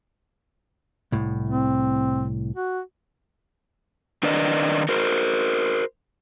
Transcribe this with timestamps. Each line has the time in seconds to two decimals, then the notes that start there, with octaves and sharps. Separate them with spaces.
1.12 C2 A2
1.51 C4
2.56 F#4
4.23 D#3 D4 A#4 B4 D5 D#5
4.89 F#4 A#4 C5